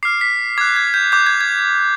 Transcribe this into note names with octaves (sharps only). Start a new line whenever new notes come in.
D6 F6 C7
B6
D6 F#6 G#6
G#6
G6
D6 F#6 G6
G#6
G#6